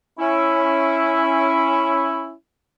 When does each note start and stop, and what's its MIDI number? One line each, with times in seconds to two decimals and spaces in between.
0.19 2.32 61
0.19 2.32 64